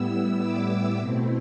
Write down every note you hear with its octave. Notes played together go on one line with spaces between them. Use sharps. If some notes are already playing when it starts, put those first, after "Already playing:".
Already playing: A2 G3 B3 E4 E6
D6
B2 A3 C4 E4